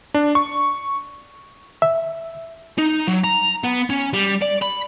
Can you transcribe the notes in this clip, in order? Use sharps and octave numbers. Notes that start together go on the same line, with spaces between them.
D4
C#6
E5
D#4
F#3
A#5
B3
C#4
G3
D5
B5